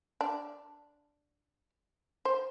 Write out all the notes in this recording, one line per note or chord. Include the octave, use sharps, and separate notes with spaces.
D4
C5